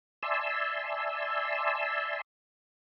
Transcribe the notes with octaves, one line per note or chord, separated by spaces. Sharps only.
D5 E5 G#5 A5 C6 E6